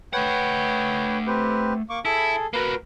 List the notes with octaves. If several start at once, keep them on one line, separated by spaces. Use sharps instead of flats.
A3 B4 C#5 F#5 G5
C4 G4 B4
A#3 C#6 D6
E4 G#4 A4
A#3 F#4 A#4 B4